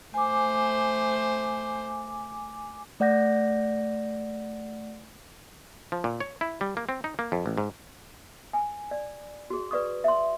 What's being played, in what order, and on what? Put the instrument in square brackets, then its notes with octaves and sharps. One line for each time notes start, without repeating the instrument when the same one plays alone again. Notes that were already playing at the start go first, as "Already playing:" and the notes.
[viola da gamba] A3 C5 [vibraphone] G#5 D6
[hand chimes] A3 D5 F#5 G6 A#6
[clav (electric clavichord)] F3
A#2
C#5
E4
G3
A#3
C4
D#4
A#3
F2
A1
G#2
[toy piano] G#5
D5
F#4 G#4
B4 D5 C#6 D#6
E5 C6